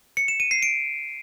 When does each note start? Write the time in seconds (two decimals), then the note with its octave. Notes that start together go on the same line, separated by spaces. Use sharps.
0.17 C#7
0.28 E7
0.40 D#7
0.51 C7
0.62 D7